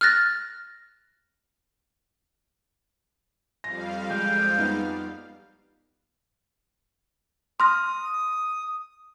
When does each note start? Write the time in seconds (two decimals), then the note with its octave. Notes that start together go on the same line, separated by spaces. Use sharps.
0.01 F6 F#6 A6 A#6
3.64 F2 G3 F5 A#6
4.11 G#3 G5
4.58 B3 D#4
7.60 C6 D#6 F6 A#6